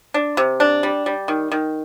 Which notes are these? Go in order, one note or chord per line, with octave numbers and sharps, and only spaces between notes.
D4
C3
D4
G3
G3
D#3
D#3